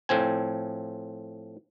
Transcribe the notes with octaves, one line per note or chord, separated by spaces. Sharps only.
A2 F3 C4 G#5